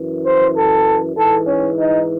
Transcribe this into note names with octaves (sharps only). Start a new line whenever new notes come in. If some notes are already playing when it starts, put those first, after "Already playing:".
Already playing: F#2 E3
C5
A4
G#2 E3 A4
C#4
D#4